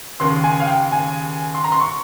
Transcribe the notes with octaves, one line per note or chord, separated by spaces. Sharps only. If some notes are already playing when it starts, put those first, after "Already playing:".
D#2 C#3 C6
G#5
F5
G5
G#5
C6
A#5
C6
C#6